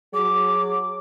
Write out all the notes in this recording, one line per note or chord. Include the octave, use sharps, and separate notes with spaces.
F#3 G#4 D6